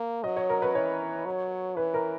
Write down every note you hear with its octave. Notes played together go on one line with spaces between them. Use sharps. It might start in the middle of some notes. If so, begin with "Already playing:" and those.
Already playing: A#3
F#3 D#5
C#5
A#4
B4
E3 C#5
F#3
E3 B4
A#4